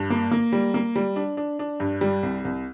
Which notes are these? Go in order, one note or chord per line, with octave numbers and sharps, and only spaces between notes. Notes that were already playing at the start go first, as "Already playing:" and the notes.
Already playing: G2
A#3
A#3
G3
A#3
G3
D4
D4
D4
G2
G3
C2
C2